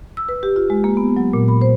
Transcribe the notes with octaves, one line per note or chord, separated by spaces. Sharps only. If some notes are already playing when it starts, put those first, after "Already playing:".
E6
B4
G4
F4
G#3
A#3
B3
F#3
A#2
B5
C5